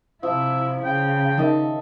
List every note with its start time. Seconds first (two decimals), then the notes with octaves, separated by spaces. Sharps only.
0.23 C3 F3 E4 E5
0.84 C#3 G5
1.38 D#3 A4 D#5 E5